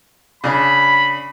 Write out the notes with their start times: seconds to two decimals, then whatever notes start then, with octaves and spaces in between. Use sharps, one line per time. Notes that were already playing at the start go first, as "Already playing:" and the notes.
0.44 C#3 D4 B5